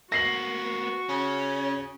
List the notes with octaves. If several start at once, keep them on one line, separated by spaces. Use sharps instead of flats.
A#3 B3 F#4 A#6 C7 F#7
C#3 C#4